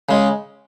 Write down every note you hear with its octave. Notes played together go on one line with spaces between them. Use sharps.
C#3 G#3